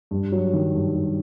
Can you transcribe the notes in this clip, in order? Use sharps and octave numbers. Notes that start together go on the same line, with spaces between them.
G2
F#3
D#3
G2
G2